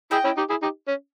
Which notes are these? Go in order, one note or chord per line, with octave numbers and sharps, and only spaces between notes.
E4 G#4 D#5 G5
C#4 E4
D#4 G4
E4 G#4
D#4 G4
C#4